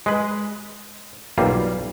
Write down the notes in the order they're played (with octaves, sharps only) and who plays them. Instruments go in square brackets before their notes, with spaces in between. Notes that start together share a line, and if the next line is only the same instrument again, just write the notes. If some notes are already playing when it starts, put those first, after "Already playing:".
[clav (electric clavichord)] G#3 B4
B1 E3 G3 A#3 F4